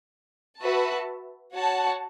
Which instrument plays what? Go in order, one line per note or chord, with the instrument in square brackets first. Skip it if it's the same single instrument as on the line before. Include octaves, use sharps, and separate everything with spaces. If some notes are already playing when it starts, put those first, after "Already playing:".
[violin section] F#4 B4 E5 A5
F#4 C#5 F#5 A5